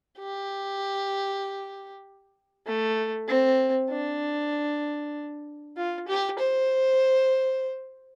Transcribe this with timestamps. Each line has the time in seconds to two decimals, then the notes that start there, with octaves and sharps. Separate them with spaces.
0.19 G4
2.66 A3
3.28 C4
3.90 D4
5.77 F4
6.07 G4
6.39 C5